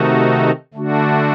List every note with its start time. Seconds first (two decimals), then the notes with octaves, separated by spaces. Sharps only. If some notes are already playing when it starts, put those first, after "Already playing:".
Already playing: C3 D#3 A3 D#4 F#4
0.74 D3 A3 D4 F#4